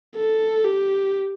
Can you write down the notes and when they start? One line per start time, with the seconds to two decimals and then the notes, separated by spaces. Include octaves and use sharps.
0.16 A4
0.64 G4